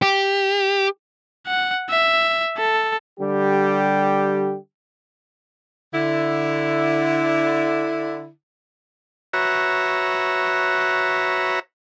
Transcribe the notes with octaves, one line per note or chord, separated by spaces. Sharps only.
G4
F#5
E5
A4
D3 G3 G4
D3 E4
F#4 B4 C#5 E5 A#5